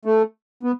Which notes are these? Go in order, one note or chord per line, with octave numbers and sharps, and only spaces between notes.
A3
B3